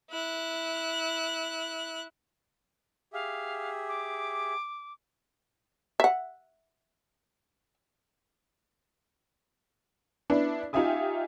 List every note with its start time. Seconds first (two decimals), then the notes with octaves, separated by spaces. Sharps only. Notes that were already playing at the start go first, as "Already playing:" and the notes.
0.10 E4 F#6
3.13 G4 G#4 E5 F5
3.88 D6
6.00 E5 F#5
10.30 B3 D4 E4
10.73 D#4 F4 G4 E5 G#5 D#6